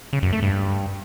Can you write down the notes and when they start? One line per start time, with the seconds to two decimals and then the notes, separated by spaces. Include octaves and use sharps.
0.13 C#3
0.23 F#2
0.33 A3
0.43 G2